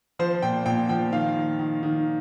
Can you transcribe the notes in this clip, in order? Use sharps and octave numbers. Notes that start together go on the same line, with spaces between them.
F3 C5
A#2 G5
A#2 G5
F3 G5
D#3 F5
D#3
D#3
D#3